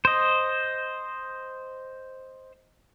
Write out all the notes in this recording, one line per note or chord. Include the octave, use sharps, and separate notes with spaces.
C5 D#5